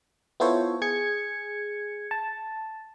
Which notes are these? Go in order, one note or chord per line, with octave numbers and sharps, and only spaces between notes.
B3 E4 F4 A4 C5 C#5
G#4 G#6 C#7
A5